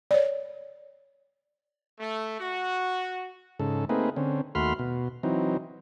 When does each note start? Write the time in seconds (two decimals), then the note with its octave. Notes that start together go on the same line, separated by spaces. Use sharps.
0.11 C#5 D5
2.00 A3
2.40 F#4
3.60 G#2 C#3 A4
3.89 A3 A#3 C4 D#4 G#4 B4
4.16 D3 C4 C#4
4.55 D#2 A3 F#4 B5 C6 F6
4.79 B2
5.23 E3 F#3 C4 D#4